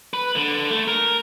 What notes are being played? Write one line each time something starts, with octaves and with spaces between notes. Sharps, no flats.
B4
D3
A3
A#4